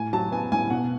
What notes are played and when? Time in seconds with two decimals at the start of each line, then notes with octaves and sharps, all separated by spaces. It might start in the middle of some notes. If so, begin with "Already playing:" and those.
Already playing: A2 G#5
0.13 F#3 A5
0.31 B3 G#5
0.52 A2 G#5
0.70 B2 F#5